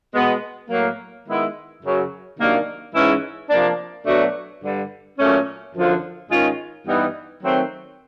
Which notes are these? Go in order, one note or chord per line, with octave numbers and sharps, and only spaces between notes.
B2 G#3 B3
A2 F#3 A#3
D#3 G#3 B3 E4
F#2 C#3 F#3
C3 D#3 F#3 A#3 D4
G#2 E3 G#3 C#4 E4
C3 F3 A#3 D4
B2 F#3 A3 D4 F#4
G2 D3 G3
A#2 F#3 A3 C#4
F#2 D3 F3
G#2 D#3 G#3 C#4 F4
G2 E3 G3 B3 D#4
D#3 F#3 A3 C4